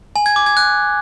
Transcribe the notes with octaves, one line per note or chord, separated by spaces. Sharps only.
G#5
G#6
D6
G#6
F#6